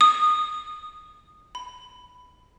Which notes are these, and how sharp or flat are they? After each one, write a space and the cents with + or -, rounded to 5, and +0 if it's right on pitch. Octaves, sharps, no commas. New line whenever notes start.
D#6 -15
B5 +10